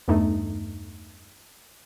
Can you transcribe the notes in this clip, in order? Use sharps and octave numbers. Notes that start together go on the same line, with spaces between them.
E2 G2 A3 D#4